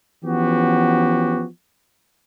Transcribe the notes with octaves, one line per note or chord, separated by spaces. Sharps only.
E3 F3 B3 C#4 F#4 G4